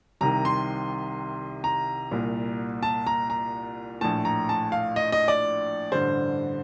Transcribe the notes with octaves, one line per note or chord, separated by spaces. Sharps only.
C2 C3 D#3 A#5
C6
A#5
C2 A#2
A5
A#5
A#5
A#1 A2 A5
A#5
A5
F5
D#5
D#5
D5
A1 G2 D3 C5